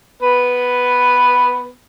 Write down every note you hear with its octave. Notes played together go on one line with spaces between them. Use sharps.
B3 B4